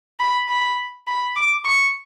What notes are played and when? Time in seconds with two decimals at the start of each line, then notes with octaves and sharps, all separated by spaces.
0.19 B5
0.48 B5
1.07 B5
1.35 D6
1.65 C#6